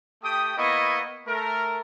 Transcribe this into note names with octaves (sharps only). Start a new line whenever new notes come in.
A3 G4 G5 D#6
A#3 B3 E4 D#5 C#6
A3 A#4